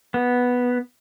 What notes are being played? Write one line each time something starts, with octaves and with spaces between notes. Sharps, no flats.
B3